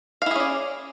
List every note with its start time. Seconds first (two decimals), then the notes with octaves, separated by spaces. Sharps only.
0.22 F5
0.26 E4
0.31 G#4
0.35 C#4
0.40 D5